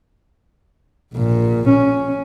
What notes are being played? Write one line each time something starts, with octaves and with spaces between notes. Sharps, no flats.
A#1 A#2
C#4